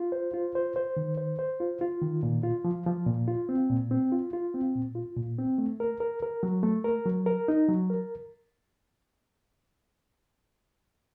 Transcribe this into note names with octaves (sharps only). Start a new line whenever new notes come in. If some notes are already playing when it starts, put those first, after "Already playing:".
Already playing: F4
C5
F4
C5
C5
D#3
C5
C5
F4
F4
D#3
A#2
F4
F3
F3
A#2
F4
C4
A#2
C4
F4
F4
C4
A#2
F4
A#2
C4
A3
A#4
A#4
A#4
F#3
A3
A#4
F#3
A#4
D#4
F#3
A#4